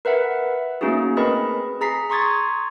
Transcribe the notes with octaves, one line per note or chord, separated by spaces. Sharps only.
A#4 B4 E5 F#5
A3 A#3 C#4 D#4 F#4 G#4
C4 G#4 A#4 B4 D#5 B5
G#4 A#5 B6 C7
A#5 C6 C#6 D#6 G#6 A6